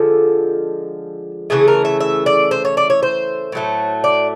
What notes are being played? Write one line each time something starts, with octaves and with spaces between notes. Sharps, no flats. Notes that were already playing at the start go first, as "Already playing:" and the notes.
Already playing: D3 F3 G#3 A4
C#3 E3 A3 G#4
A#4
E5
E5
D5
C5
C#5
D5
C#5
C5
A2 F#3 A3
D5